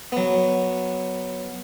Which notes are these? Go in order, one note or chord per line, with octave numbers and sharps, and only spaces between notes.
F#3 B3